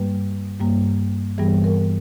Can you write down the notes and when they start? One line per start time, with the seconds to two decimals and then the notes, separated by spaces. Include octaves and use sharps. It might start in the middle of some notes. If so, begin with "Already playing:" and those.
Already playing: G2 G3 A#3 B4
0.60 G2 G3 A#3
1.38 G2 E3 G3 B3 G#4
1.64 A#4